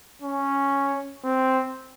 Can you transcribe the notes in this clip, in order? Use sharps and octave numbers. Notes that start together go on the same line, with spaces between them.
C#4
C4